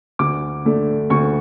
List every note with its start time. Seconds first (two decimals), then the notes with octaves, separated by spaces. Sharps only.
0.19 D2 D6
0.65 D3 A3 D4
1.10 D2 C#6